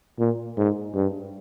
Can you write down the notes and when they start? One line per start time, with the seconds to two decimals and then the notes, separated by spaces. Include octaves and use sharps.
0.19 A#2
0.57 G#2
0.94 G2